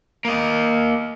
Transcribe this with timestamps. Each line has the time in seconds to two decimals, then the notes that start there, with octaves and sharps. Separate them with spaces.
0.25 A#3 D#5